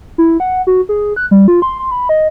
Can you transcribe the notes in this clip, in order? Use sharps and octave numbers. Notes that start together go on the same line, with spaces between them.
E4
F#5
F#4
G#4
F#6
G3
F4
C6
C6
B5
D#5